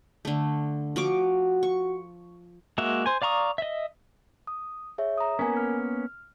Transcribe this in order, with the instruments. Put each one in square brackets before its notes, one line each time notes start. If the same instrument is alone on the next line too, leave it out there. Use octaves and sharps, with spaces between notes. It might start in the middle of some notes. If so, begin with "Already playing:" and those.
[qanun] D3 A3
[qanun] F3 C#6 D6 [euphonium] F#4
[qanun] C#6
[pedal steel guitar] G#3 A#3 F#4 E5
C5 G#5
D5 F5 A#5 C#6 D#6
D#5 E5
[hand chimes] D#6
G#4 C#5 E5
A#5 D#6
[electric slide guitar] A#3 B3 C#4 [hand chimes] A#4 G#5
[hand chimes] F6